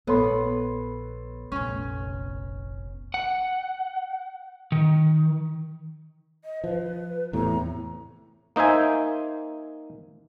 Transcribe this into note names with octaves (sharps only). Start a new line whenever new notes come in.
A#1 B3 A4 C#5 C6
F1 A#1 C#4
F#5
D#3
D#5
F3 B4
E2 A2 C3 A#5
A#3 D#4 C5 E5 G#5